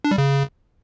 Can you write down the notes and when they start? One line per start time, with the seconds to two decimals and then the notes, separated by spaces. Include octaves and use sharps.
0.05 D4
0.11 G3
0.18 C#3